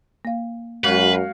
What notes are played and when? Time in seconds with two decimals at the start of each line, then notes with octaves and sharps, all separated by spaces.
0.25 A#3 F5
0.84 F#2 G#3 F#4 B4 C#5 F5